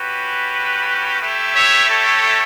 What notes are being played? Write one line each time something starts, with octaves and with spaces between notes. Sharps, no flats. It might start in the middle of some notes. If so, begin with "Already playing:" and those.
Already playing: C#4 F#4 G4 B4
A3 E4 G4
C#5 E5
A4 C#5